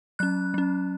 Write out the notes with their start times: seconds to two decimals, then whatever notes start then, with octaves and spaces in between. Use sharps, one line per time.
0.19 F#3 C#4 F#6
0.54 F#3 C#4